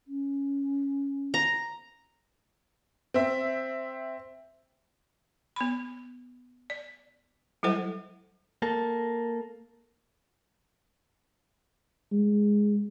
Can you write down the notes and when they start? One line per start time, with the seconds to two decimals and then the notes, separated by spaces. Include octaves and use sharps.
0.08 C#4
1.34 A#5
3.14 C4 E5
5.56 B3 B5
6.70 D5
7.63 F#3 G3 E4 A4 C5 F#5
8.62 A#3 A4
12.12 G#3